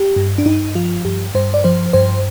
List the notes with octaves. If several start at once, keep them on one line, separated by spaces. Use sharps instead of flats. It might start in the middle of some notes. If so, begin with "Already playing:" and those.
Already playing: G4
G2
D4
G2 D#4
F3 F4
G2 G4
G2 C5
D5
F3 C5
G2 C5